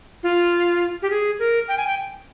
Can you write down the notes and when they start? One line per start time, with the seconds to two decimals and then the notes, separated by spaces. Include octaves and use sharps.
0.23 F4
1.02 G4
1.10 G#4
1.39 A#4
1.68 G5
1.78 G#5
1.87 G5